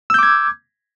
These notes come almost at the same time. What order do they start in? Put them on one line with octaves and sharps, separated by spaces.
E6 G6 D6 G#6